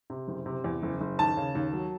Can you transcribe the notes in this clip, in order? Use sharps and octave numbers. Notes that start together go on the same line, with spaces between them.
C3
F#1
C3
E2
F#1
F#1
D#2 A5
C#3
D#2
F#3